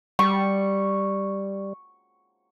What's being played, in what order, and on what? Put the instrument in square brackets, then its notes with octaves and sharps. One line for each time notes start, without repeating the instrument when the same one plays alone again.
[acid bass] G3 [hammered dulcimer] C#6